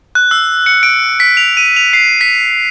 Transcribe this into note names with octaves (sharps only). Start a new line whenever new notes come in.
F#6
E6
C#7
D7
B6
F7
D#7
F7
C7
B6